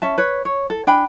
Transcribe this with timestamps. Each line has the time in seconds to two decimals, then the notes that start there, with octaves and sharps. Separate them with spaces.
0.02 C#4 E5 A5
0.18 B4 C#5
0.45 C#5
0.70 A4
0.87 D4 G5 G#5 B5